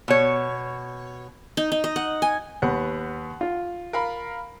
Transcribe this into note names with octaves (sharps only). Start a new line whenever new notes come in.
B2 C#5
D#4
D#4
D#5
F#5
G#5
D#2 B3 F#5
F4
A#4 F5 B5